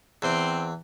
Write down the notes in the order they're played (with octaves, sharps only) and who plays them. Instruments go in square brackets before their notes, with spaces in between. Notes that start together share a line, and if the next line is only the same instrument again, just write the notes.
[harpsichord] E2 [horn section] C4